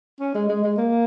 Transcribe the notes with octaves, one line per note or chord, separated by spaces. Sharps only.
C#4
G#3
G#3
G#3
A#3